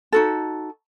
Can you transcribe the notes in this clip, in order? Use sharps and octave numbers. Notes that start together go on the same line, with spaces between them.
D#4 F#4 A4